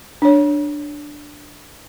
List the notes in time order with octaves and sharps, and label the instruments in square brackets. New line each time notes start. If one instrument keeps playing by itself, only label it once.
[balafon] D4 C#5